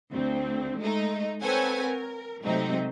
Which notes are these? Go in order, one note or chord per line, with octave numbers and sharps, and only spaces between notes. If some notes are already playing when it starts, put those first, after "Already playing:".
D2 C4
G#3 A3 D#4
C4 A4 B4 C#5 F#5 G#5
A#4
G#2 C3 F#3 A3 C4 D#4